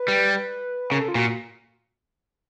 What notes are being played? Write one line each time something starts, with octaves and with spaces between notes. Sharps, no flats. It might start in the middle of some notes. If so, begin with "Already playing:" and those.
Already playing: B4
G3
C#3 A#4
A4
F4
A#2 F#4